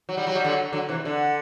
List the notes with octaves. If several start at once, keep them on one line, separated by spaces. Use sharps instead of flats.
F#3
G3
F#3
G3
D3 F#3
D3 F#3
C3 E3
D3